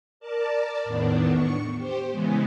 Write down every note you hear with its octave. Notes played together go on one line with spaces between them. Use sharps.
A#4 D5 A5
E2 A2 D#3 B3 D4
C#6
G4 C5
C#3 E3 G#3 B3